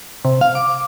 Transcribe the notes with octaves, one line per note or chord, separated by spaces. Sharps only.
C3
F5
D6